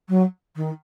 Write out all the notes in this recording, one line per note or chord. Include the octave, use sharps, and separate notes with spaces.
F#3
D#3